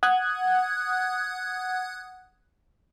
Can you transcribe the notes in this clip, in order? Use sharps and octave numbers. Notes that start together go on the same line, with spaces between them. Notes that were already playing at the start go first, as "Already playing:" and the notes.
F#5 D#6 F#6 G#6